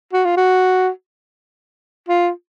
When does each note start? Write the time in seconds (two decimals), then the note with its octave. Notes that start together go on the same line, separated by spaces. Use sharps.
0.13 F#4
0.25 F4
0.37 F#4
2.09 F4